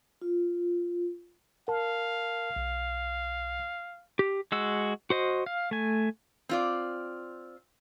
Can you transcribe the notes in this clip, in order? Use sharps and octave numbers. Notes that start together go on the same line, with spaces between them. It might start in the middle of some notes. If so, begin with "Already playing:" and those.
F4
A#4 F5 A5
B1
G4
G#3 F#4 E6
F#4 C5 D#5
F5
A3 G#5
C4 F4 D5